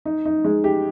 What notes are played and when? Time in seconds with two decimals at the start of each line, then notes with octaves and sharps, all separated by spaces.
0.06 D#4
0.25 D#4
0.45 G#3
0.64 G4